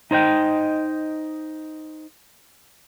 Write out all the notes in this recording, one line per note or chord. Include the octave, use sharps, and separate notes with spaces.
D#4 C5 D#5 G5